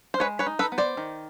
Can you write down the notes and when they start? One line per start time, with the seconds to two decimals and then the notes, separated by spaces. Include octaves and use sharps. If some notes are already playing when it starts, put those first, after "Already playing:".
0.14 C5
0.20 G#3 B4 C#5
0.39 B4 C#5
0.47 D#4
0.59 A4 B4
0.72 B3
0.78 C5 D5
0.97 D#3